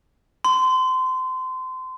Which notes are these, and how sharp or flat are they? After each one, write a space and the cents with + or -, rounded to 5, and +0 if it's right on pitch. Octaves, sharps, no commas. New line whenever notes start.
C6 -25